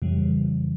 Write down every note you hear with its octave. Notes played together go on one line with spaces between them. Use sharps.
F2 C#3 E3 G3